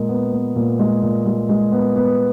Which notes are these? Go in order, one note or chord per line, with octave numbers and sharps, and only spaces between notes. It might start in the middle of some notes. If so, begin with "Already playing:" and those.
Already playing: A#2 G#3 A#4
B3
B3
A#2
G#3
A#2
G#3
G#3
B3
B3